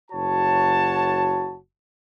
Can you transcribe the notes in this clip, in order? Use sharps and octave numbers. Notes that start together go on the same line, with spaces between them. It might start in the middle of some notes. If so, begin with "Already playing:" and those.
F#1 F#4 C#5 A5